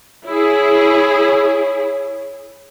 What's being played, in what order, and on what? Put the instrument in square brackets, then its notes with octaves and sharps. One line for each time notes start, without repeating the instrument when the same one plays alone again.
[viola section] E4 G#4 [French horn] C#5